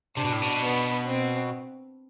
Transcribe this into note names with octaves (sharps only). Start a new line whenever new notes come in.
C3 D4
B2
A2
B2
B3
C4